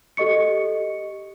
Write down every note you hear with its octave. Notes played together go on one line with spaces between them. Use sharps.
G4 A4 D#5 C#6 C#7